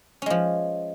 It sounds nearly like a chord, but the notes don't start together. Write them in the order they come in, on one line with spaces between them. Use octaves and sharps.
C#4 G#3 F3